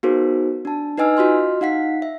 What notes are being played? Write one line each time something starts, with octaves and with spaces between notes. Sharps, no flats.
B3 D#4 F#4 G#4 A#4 C5
D4 A5
D#4 B4 D#5 G#5 E6 F6
F4 F#4 D#5 C6 F6
D#4 F5 F#5 B6
E5